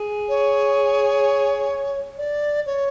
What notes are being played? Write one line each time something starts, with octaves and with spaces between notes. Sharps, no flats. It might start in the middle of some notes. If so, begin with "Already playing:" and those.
Already playing: G#4
C#5
D5
C#5